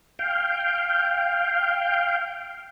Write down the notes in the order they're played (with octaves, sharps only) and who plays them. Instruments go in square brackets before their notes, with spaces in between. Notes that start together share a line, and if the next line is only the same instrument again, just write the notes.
[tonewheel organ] F5 G5